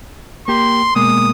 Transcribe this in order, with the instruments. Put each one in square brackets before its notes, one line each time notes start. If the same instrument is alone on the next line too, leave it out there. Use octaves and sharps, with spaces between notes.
[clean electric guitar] A#3 G4 [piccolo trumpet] C6
[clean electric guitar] B2 G#3 A#3 [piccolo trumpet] D#6